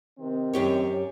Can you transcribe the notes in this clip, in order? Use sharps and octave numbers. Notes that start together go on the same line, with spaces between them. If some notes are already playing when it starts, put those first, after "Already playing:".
C3 D#3 C4
F#2 G4 C#5